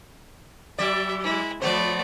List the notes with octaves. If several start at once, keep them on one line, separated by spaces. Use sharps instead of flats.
F#3 D5 E5
G#3 E4
F3 A3 B3 C5 D5